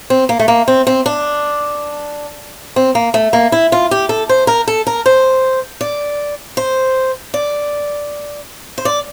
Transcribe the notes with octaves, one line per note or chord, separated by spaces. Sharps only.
C4
A#3
A3
A#3
C4
C4
D4
C4
A#3
A3
A#3
E4
F4
G4
A4
C5
A#4
A4
A#4
C5
D5
C5
D5
C5
D5